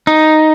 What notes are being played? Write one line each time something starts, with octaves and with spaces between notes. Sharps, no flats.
D#4